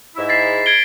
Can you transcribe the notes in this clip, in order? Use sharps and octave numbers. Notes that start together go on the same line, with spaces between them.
G#2 E4 E5
A6 B6 C7
G#6 D7 G7